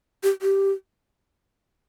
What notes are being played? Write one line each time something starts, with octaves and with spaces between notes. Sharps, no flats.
G4
G4